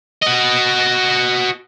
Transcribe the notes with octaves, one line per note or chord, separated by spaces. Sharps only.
F#4 D#5